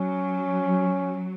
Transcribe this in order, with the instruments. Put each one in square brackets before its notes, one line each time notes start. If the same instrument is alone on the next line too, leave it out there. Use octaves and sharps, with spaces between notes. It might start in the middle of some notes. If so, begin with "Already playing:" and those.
Already playing: [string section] F#3 [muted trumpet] C#4